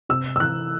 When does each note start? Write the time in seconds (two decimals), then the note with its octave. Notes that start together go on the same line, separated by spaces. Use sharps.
0.09 C3 E6
0.36 E6
0.40 E3 F#6